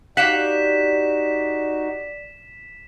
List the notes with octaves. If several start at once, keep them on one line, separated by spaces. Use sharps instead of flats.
D#4 F#4 G4 D5 F5 F#5 B6 E7